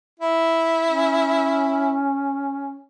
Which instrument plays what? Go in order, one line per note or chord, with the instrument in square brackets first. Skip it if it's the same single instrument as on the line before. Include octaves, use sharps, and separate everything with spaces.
[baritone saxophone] E4
[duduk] C#4